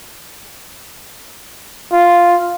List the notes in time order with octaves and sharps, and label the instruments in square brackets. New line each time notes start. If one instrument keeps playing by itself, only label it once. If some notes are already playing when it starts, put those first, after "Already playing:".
[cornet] F4